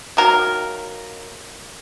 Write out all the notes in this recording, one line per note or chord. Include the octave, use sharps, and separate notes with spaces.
D#3 F#3 A#3 A#4